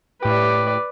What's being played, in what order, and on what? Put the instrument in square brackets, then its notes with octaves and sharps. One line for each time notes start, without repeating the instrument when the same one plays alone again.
[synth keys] A2 G4 [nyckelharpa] B4 D5